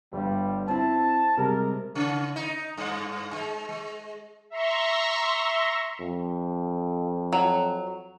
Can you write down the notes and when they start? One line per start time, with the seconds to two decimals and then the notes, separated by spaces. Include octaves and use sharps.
0.13 G1 G2 G3
0.68 C4 E4 A5
1.37 C3 G3 G#3 A#4
1.95 C#3
2.36 D#4
2.77 G2
3.33 G#3
3.69 G#3
4.50 E5 A#5 C6 C#6
6.00 F2
7.33 F#3